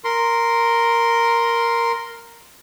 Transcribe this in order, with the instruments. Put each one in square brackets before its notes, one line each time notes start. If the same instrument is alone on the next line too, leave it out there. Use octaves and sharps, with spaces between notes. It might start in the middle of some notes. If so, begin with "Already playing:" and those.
[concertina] A#4 C6